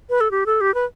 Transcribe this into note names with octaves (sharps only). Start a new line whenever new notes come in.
B4
A4
G4
A4
G4
B4